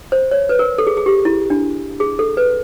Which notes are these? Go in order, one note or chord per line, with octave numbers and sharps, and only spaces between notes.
C5
C#5
B4
A#4
A4
G#4
G#4
G4
E4
D4
G#4
A4
B4